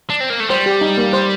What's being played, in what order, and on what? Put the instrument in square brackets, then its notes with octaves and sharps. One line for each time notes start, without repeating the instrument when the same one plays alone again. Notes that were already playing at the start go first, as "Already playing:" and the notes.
[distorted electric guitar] D4
C4
A#3
A3
[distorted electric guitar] G3 [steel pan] C5
[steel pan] G4
D#4
A#3
C5